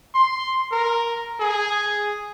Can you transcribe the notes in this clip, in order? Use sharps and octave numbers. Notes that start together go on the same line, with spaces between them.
C6
A#4
G#4